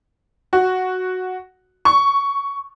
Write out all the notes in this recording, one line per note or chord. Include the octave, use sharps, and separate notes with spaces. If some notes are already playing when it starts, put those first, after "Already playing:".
F#4
C#6